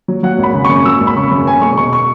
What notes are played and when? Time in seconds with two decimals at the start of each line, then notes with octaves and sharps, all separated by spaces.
0.08 F#3
0.23 F#3 F#5
0.38 G#1 B5
0.54 C#3
0.65 C#6
0.69 F#2
0.85 F#3 E6
1.01 G#1
1.07 B5
1.15 C#3 C#6
1.31 F#2
1.47 B3 G#5
1.62 E1 C#6
1.78 B2 C#6
1.93 C#6